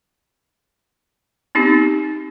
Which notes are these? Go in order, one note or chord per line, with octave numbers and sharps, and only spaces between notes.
B3 C4 D#4 G4